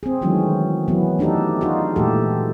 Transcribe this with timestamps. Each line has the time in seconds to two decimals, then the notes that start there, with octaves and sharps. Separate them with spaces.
0.03 C4 G#4
0.21 D#3 E3 F#3 G#3 A3 C#4
0.88 E3 F#3 B3
1.19 A3 D4 D#4 G4 A4
1.61 D#4 F4 F#4 G#4
1.96 A#2 E3 G#3 A3 G4 A4